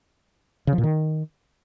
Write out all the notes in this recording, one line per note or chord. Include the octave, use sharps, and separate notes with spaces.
C#3
F3
A#2
D#3